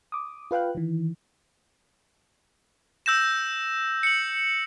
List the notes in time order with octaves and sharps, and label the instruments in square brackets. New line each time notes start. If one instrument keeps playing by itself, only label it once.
[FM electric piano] D6 D#6
F4 B4 F5 G5 F#6
D#3 E3
[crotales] E6 G6 A#6 E7
C#7 F#7